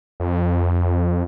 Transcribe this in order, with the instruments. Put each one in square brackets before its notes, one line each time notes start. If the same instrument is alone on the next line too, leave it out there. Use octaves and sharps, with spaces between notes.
[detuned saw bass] F2